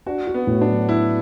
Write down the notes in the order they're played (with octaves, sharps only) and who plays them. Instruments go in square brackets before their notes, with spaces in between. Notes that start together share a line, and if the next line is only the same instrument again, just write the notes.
[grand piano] D4 [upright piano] F#4
[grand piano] F#4
[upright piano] B3
[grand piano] A2
[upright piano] D4
[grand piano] F#3
[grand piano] D4 [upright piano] E4